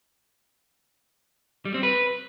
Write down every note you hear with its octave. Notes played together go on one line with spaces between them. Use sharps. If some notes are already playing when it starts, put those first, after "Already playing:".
G3
C4
B4